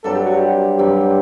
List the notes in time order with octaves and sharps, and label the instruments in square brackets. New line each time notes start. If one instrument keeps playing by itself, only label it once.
[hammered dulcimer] G2 F#3 C4 [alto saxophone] A4
[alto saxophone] G4
F#4
G4
[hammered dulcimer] G2 F#3 C4 [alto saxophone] G4